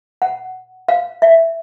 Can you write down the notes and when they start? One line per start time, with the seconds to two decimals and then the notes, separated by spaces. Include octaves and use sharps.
0.22 F#5
0.88 F5
1.22 E5